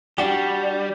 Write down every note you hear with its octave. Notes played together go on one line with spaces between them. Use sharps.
G3 D4 F#4 G4